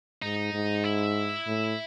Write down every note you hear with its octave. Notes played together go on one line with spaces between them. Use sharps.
G#2 D#4
G#2
E4
A2